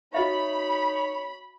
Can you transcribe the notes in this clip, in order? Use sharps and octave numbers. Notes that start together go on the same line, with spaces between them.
D#4 F#4 C#5 D#5 E5 B5